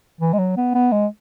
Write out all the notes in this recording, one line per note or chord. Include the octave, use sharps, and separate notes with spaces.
E3
G#3
F#3
B3
B3
G#3